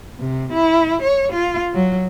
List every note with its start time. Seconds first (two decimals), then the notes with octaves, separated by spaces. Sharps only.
0.18 C3
0.53 E4
1.02 C#5
1.33 F4
1.74 F#3